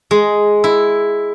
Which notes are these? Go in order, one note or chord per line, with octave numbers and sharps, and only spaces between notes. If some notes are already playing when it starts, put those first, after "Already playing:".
G#3
E4